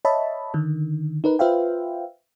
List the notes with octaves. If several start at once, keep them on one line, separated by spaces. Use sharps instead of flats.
C#5 D#5 E5 A5 B5
D3 D#3
D#4 A#4 B4
F4 B4 C5 E5 F5 G5